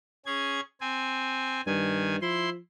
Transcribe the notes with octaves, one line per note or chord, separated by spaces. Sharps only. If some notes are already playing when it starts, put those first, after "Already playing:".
C#4 G#4 G#6
C4 G#5
G2 D#3 G#5
F3 E4 C6